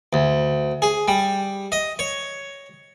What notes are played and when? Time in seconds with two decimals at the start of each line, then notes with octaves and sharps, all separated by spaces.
0.13 D2
0.82 G#4
1.08 G3
1.72 D#5
1.99 C#5